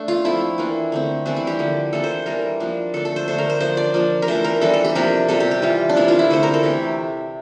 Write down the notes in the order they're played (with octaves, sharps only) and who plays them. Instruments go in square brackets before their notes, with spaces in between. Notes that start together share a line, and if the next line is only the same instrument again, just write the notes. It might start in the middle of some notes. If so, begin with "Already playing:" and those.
Already playing: [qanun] A3 D4
F4
F3 A3 C4 E4
E3 A#3 D4
D3 A3 C4
E3 G3 C4 D4
E4
G4
D3 F3 A#3
E3 A#3 D4 A4
C5
E3 G3 D4 A#4
F3 A#3 D4
D3 A3 D4 A4
A4
C5
D3 A3 D4 C5
A#4
C5
F3 A#3 D4 C5
D5
F3 A#3 D4
A#4
E3 A3 D4 C5
A#4
E3 G3 D4 A4
A4
G4
C3 F3 A#3 D4 A#4
C3 G3 D4 A4
G4
G4
E3 G3 D4 F4
D4
C3 E3 A#3 E4
F4
E4
D3 A3 C4 C5
A#4
A4
C3 E3 A3 G4